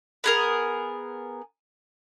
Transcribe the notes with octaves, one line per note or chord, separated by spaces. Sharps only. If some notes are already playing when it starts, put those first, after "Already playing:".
B3 G#4 A#4